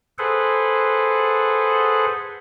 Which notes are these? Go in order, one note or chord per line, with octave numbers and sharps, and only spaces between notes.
G#4 A4 B4 C5 F#5